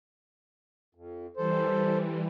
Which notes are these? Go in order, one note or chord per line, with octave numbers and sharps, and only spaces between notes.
F2
E3 G3 A4 C5